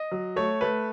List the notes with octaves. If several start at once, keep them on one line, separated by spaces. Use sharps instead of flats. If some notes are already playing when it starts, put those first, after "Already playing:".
Already playing: D#5
F#3
A3 C#5
A3 B4